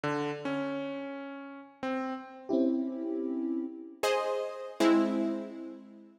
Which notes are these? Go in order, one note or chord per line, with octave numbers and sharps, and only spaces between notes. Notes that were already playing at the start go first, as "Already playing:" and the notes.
D3
C#4
C4
C4 C#4 E4 G4
G#4 C5 D#5
G#3 C4 E4